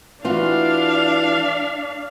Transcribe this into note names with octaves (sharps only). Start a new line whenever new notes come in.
E3 D4 F4 F#4 F5